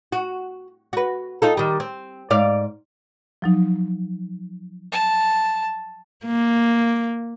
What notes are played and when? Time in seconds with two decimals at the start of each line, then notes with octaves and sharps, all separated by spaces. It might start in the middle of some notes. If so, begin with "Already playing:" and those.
0.12 F#4
0.93 F#4 B4
1.42 D#4 F4 A4
1.57 D#3 G3
1.80 C4
2.30 G#2 D5 F5
3.42 F3 F#3 D#4
4.92 A5
6.26 A#3